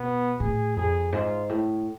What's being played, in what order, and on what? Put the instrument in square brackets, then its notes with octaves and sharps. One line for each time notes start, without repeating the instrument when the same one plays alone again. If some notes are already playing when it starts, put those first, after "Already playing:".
Already playing: [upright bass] B2 [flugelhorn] B3
[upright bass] A2 [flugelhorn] G#4
[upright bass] F2 [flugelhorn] G#4
[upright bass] G#2 [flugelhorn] F4
[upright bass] A2